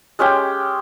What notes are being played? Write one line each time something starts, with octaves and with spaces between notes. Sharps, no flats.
G#3 C#4 G4 G5